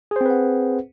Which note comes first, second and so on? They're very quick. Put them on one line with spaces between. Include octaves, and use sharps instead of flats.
G#4 C5 C4 B4 F#5